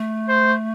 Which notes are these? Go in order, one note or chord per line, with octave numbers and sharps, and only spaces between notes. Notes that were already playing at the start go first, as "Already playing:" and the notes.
Already playing: A3
C5